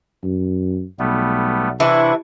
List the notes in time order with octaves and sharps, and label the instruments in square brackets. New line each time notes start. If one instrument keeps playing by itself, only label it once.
[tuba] F#2
[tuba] B1 [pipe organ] G3 A3 B3
[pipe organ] C3 D4 C#6 [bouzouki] E3 E4